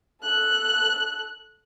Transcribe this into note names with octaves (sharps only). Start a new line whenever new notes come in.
A4 F#6